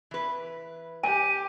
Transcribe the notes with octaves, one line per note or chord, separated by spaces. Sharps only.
E3 B4
G4 G#5 D#7